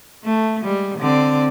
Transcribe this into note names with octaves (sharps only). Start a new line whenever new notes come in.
A3
G3 G#3
D3 C4 D5